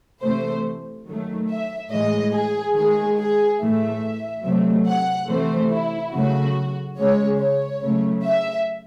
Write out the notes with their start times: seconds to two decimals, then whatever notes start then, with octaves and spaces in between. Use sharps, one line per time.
0.22 C3 E3 A3 C5
1.07 D#3 F#3 A3
1.49 E5
1.91 A2 E3 G#3 D#5
2.33 G#4
2.75 D#3 G#3 G#4
3.18 G#4
3.61 A2 E3 A3 E5
4.44 C3 F#3 A3
4.86 F#5
5.28 C3 E3 A3 C5
5.72 E4
6.13 C#3 F#3 A3 F#4
6.98 C#3 G#3 C#5
7.40 C#5
7.82 C#3 F#3 A3
8.24 E5